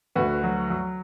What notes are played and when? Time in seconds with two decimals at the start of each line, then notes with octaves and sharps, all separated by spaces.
0.15 D2 F#4 B4
0.43 F#3
0.70 F#3